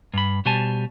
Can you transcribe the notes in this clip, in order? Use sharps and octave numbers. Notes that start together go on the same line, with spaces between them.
G2 B5
B2 G3 C5 G#5 A5